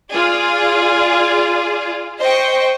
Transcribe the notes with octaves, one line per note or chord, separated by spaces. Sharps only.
F4 G#4 D5
C5 D#5 G5 C#6